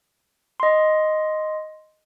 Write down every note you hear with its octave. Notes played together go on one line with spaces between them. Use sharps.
D#5 C6